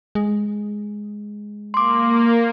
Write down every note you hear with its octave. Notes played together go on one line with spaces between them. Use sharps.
G#3
A#3 C6 D6